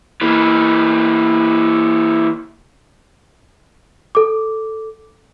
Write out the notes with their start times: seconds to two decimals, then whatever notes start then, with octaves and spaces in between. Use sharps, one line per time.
0.21 E3 A#3
4.15 A4 D6